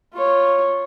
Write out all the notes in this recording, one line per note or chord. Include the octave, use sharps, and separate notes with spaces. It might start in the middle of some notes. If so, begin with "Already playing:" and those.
F4 C#5